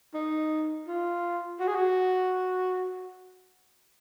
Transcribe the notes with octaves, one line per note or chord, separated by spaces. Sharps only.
D#4
F4
F#4
G#4
F#4